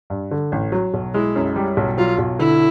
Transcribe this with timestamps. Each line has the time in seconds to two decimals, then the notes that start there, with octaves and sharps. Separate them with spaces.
0.10 G2
0.31 D3
0.52 A1
0.72 F#3
0.94 B1
1.14 G#3 E4
1.36 F#2
1.56 G3
1.77 B1
1.98 F#3 F4
2.19 B1
2.39 D3 E4